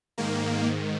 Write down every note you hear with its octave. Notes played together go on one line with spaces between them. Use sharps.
G#2 D#3 A#3